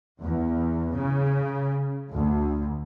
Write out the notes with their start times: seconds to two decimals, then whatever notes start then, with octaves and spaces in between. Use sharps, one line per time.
0.22 E2
0.95 C#3
2.13 D2